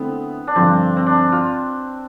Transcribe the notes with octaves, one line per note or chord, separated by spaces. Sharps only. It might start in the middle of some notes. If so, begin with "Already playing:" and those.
Already playing: D3 A3 B3 C4 E4
D4
G2 D3 F3 C4
C4
D4
F4